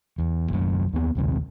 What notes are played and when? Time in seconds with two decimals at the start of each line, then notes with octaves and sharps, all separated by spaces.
0.18 E2
0.48 F#1 B1 F#2
0.93 D#2 B3
1.15 A#1 D#2 C3